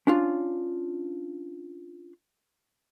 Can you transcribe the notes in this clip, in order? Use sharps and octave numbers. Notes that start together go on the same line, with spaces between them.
C#4 D4 F4